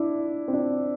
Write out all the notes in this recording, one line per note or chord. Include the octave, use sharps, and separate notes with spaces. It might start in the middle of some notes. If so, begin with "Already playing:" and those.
Already playing: D4 E4
C4
D4